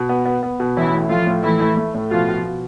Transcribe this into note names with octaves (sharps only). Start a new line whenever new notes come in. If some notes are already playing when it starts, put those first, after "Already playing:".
Already playing: B2
B3
B3
B3
B2
A1 E3 E4
A2
F3 A3 F4
A2
E3 A3 E4
A3
A3
A2
B2 F3 F4
B2
B2